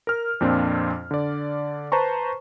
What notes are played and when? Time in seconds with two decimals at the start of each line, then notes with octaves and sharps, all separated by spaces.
0.07 A#4 F6
0.41 F2 A#2 C4 D4 F4
1.11 D3 D5
1.92 B4 C5 A5 A#5 C#6